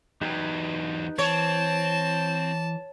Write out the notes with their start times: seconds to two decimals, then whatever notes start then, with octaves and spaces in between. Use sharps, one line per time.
0.21 E2 F#3 D#4 G4 B4
1.19 E3 C4 C#5 A5